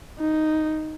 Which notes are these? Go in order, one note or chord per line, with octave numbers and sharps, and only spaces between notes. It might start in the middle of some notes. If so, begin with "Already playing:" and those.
D#4